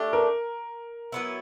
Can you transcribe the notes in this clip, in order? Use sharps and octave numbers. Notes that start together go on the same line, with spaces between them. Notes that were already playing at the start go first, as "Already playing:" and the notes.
Already playing: A3 D4 G4
A#4
F#3 B3 E4